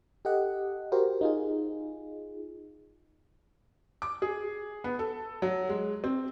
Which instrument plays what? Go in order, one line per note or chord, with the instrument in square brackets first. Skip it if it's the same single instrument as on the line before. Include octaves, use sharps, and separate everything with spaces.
[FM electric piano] G4 A4 D#5 F#5
F#4 G4 A#4 C5
D#4 F4 G#4
[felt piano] D6
G#4
B3
A4
F#3
G#3
C4